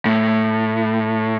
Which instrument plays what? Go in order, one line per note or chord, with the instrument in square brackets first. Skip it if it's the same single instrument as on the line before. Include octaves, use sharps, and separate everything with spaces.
[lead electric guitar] A2